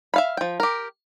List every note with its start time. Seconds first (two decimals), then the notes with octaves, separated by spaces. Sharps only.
0.14 E5 F5 B5
0.37 F3 G5
0.60 G4 A#4